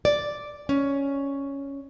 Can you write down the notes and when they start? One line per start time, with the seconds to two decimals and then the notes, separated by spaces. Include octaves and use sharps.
0.05 D5
0.69 C#4